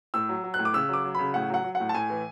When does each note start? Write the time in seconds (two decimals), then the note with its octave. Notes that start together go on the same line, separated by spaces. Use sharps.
0.14 A2 E6
0.29 F#3
0.44 F#3
0.54 F#6
0.59 A2
0.65 D6
0.73 C#3 E6
0.89 F#3 D6
1.05 F#3
1.15 C#3 B5
1.34 A2 F#5
1.50 F#3 F#5
1.64 F#3
1.75 F#5
1.80 A2
1.89 A5
1.94 A2 G#5
2.10 E3